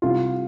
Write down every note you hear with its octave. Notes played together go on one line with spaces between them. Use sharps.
C2 F4